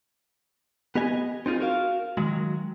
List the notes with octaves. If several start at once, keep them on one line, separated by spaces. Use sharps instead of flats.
B3 G4 D#5 G#5
C4 D#4 F4 G#4
F#4 A#4 F5
D#3 F#3 G#3